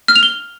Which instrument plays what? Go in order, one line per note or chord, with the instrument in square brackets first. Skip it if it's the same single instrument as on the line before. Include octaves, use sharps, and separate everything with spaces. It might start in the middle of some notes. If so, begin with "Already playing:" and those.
[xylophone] F6
F7
G7